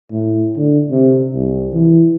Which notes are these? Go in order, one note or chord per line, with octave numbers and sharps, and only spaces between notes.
A2
D3
C3
C2
E3